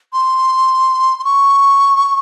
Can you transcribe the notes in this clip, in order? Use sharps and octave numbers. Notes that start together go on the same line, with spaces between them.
C6
C6
C#6